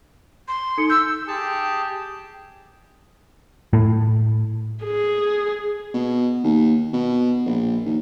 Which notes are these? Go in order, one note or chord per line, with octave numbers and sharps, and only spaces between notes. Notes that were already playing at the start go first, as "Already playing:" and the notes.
C6
D#4 A4 C#7
E6 G6
G4 G#4 A5
A2
G#4
B2
D#2
B2
A#1
D#2